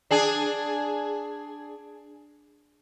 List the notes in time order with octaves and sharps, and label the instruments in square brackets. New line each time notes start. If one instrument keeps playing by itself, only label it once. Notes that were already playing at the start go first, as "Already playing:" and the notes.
[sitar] D4 G#4